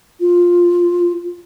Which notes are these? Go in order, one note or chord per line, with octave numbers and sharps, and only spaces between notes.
F4